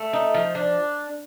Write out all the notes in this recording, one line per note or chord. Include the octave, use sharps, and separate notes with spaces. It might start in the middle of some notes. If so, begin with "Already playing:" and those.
Already playing: A3
D#4
F3
D4